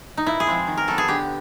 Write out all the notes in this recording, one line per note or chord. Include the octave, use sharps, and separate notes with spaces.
D#4
A#2 E4
G#4
F3 G#3 C4
D#3
A#4
F#3 B3 A4
G#4
D3 G4